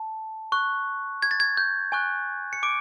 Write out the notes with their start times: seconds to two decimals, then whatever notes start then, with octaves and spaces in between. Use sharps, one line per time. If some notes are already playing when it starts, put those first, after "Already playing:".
Already playing: A5
0.52 C#6 F#6
1.22 G#6
1.31 A6
1.40 G#6
1.57 G6
1.92 G#5 C#6 F#6
2.53 C#7
2.63 D6 D7